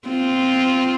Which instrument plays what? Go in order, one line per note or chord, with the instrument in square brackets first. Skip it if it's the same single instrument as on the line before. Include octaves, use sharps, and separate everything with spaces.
[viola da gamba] C4 F4